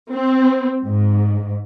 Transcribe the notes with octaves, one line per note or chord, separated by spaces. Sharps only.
C4
G#2